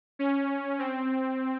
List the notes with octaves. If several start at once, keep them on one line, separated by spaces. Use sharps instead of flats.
C#4
C4